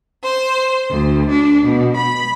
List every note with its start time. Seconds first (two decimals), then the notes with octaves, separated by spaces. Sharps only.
0.24 C5
0.90 D2
1.30 D4
1.65 B2
1.96 B5